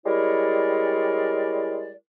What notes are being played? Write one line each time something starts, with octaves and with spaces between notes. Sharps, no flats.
G3 G#3 E4 A#4 C#5 D5